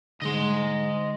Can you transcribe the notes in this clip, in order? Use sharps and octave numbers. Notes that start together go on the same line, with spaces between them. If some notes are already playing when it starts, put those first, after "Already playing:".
G#2 D3 G#3 D#5 C6